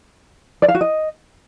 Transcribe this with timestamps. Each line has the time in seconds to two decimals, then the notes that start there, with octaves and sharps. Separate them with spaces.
0.62 D5
0.68 F5
0.75 F#4
0.81 D#5